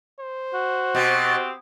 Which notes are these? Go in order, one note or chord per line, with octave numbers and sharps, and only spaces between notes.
C5
F#4
B2 C4 G4